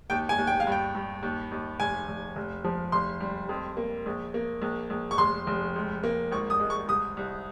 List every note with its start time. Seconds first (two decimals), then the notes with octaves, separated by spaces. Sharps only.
0.10 D#2 G5
0.29 G#5
0.38 D#2
0.47 G5
0.60 F5
0.67 G2
0.72 G5
0.95 G2
1.23 D#2
1.52 D#2
1.80 F1 G#5
2.08 F1
2.36 F1
2.64 F3
2.92 F1 C6
3.20 G3
3.49 F2
3.77 A#3
4.06 A#1
4.34 A#3
4.62 A#1
4.90 A#1
5.11 C#6
5.18 F1 C6
5.47 F1
5.76 C#2
6.04 A#3
6.32 G#1 C#6
6.50 D#6
6.60 G#3
6.70 C#6
6.88 C2 D#6
7.17 C2